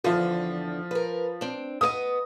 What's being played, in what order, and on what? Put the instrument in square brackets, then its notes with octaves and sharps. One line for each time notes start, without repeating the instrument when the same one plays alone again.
[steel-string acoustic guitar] E2 D3 [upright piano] F3 F4
[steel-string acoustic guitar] A#4 B4
C4 D4
[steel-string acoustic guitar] B3 A#4 D#5 [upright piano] D#6